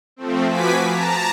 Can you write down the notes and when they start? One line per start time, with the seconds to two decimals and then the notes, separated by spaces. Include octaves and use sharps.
0.16 F3 A3 C4
0.48 F3 F#4 B4 G#5 D6 B6
0.85 A5 A#5